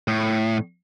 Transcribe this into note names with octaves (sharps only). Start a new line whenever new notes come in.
A2